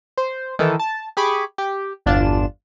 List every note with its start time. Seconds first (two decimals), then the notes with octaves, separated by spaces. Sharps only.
0.18 C5
0.59 D#3 E3 A4
0.79 A5
1.17 G4 G#4 G#5 B5 C#6 D6
1.58 G4
2.06 G1 E2 D4 F4 E7